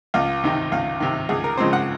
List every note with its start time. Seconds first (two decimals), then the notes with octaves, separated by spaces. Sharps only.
0.14 C#2 F5
0.44 C3 D#3
0.72 C#2 F5
1.00 C3 D#3
1.29 C#2 G#4
1.44 A#4
1.57 C#3 F3 G#3 C4 C5
1.73 F#5